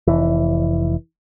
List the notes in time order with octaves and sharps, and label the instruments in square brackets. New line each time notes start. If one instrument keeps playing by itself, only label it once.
[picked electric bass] F1 E3